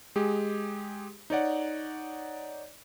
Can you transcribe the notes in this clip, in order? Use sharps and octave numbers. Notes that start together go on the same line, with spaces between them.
G#3 G4 G#4
D#4 C#5 D5 F#5